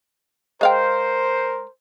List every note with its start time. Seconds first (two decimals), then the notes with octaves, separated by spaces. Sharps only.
0.61 G#3 A#4 C5 F5 G5